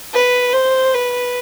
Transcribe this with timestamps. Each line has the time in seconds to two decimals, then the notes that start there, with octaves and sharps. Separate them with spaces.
0.13 B4
0.53 C5
0.94 B4